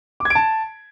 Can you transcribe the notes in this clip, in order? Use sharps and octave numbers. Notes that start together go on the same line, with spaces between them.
D6
G#6
D7
A5